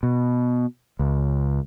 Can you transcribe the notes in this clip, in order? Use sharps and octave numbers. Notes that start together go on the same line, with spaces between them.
B2
C#2